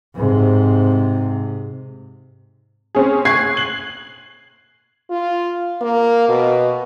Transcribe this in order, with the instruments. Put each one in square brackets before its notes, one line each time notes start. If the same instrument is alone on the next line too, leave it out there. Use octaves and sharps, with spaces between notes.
[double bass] G#2 C3
[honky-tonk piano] C4 C#4 G#4
C#6 F#6 G#6 C7
F#7
[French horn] F4
A#3
B2